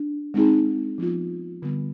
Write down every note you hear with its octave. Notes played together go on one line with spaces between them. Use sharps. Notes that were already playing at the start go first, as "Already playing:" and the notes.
Already playing: D4
G#3 C4 D#4 G#4
F3 B3 F4
D3 G3 B3